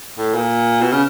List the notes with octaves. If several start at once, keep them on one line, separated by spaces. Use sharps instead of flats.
A2
A#2
B2
C#3